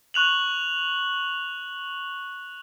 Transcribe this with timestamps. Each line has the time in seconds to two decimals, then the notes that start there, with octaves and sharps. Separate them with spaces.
0.14 C#6 F#6 F7 F#7